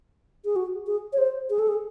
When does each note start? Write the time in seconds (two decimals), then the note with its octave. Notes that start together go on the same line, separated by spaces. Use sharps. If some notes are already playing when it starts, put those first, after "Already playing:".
0.45 G#4
0.56 F#4
0.87 G#4
1.13 C#5
1.18 C5
1.50 G#4
1.59 A4
1.68 G#4